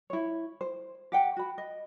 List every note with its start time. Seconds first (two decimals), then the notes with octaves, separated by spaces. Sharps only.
0.10 E4 C#5
0.61 C5
1.12 G4 F#5 G5
1.37 F#4 B5
1.58 D#5